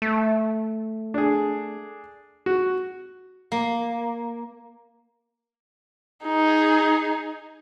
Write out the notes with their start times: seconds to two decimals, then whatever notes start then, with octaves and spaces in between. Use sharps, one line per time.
0.02 A3
1.14 D4 G#4
2.46 F#4
3.52 A#3
6.24 D#4 G#4